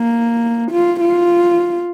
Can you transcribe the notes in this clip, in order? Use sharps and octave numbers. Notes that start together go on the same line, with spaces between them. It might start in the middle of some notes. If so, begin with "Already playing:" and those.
Already playing: A#3
F4
F4